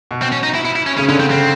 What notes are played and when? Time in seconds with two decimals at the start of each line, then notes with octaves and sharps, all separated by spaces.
0.11 B2
0.22 C4
0.32 C#4
0.43 D#4
0.55 E4
0.65 E4
0.76 E4
0.87 C#4
0.98 C#3 C#4
1.08 D3 C#4
1.20 D3 C4
1.30 C#3 C4